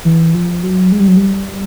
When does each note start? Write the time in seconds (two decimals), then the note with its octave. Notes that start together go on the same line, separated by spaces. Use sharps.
0.05 E3
0.34 F3
0.63 F#3
0.92 G#3
1.00 G3
1.08 F#3
1.17 G3